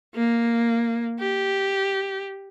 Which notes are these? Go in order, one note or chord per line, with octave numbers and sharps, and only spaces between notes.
A#3
G4